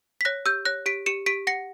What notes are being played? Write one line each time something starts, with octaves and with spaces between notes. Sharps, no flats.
B6
C#5 F#6 A#6
G4 E6 G6
C#5 F#6 A#6
G4 B6 D7
G4 C#7 E7
G4 B6 D7
F#5 A#6 C#7